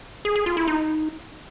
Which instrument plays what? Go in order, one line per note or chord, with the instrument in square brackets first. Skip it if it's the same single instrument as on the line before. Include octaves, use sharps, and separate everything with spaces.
[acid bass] G#4
G#4
F4
E4
D#4